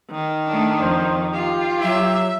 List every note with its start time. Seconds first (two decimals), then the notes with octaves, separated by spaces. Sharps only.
0.11 D#3
0.47 A3 D4
0.81 F2 C5
1.33 F4 G4
1.82 F#3 E5